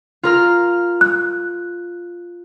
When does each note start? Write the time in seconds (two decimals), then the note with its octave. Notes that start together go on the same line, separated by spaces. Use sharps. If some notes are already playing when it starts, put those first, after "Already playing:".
0.23 F4 A#4 F6
1.01 F#6